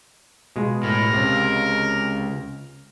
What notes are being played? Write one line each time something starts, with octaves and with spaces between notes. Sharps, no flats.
B2 G#3 F4
A2 A#4
C#2 C3